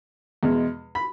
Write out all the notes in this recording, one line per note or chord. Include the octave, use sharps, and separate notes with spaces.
E2 B2 G#3
B5